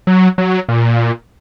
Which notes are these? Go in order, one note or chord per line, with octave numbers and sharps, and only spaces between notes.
F#3
F#3
A#2